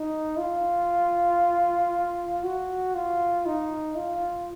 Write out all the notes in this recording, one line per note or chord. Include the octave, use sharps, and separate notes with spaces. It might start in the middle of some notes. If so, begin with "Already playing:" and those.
Already playing: D#4
F4
F#4
F4
D#4
F4